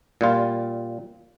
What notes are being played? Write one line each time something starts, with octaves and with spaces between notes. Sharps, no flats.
A#2 G3 F4